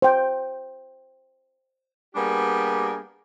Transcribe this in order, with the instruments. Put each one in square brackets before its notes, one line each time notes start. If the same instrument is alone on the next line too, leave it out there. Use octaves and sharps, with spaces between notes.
[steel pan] C5 G5
[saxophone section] G3 A#3 B3 D4 G4 G#4